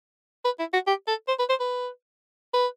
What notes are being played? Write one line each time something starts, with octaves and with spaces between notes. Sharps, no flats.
B4
E4
F#4
G4
A4
C5
B4
C5
B4
B4